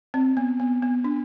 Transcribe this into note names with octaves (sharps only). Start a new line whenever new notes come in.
C4
B3
B3
B3
D4